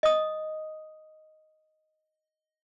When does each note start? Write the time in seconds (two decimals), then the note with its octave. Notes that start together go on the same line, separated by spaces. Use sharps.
0.03 D#5 D#6